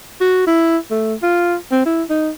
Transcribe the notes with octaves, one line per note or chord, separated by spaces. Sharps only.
F#4
E4
A3
F4
C4
E4
D#4